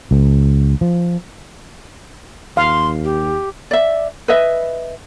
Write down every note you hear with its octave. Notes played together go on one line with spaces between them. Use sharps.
C#2
F3
D#2 F5 C6
G4
D5 E5
B4 D#5 E5